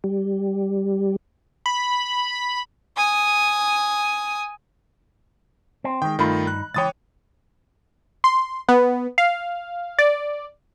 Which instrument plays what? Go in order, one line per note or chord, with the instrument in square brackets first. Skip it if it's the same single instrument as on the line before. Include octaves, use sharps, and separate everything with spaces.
[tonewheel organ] G3
[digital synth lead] B5
[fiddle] G#5 D#6
[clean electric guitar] C4
[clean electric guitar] D#3 G#3 [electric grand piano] G5
[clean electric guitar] G2 D#4 B5 [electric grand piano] D#3 A3 F4
[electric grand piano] F#6
[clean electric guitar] C#2 E3 G5 [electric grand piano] C#5 D#6 A6
[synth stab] C6
B3
F5
D5